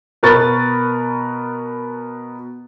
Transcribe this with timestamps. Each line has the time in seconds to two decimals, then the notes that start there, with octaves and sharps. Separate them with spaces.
0.23 B2 A#4 B4 C#6 A6